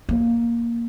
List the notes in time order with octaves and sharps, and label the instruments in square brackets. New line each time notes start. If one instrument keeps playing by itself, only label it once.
[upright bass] A#3